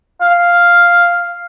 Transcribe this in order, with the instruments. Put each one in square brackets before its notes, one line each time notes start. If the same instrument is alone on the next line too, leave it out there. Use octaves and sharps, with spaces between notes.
[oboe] F5